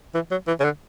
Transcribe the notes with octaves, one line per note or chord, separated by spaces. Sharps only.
E3
F#3
E3
C#3
D3